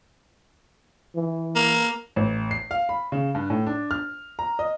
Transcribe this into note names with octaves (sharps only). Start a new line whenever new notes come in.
E3
A#3
A1
C7
F5
B5
C#3
G2
A2
D4
F6
A#5
D#5